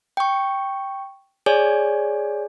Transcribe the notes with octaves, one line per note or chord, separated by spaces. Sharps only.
G5 C#6
G#4 C#5 D5 G#5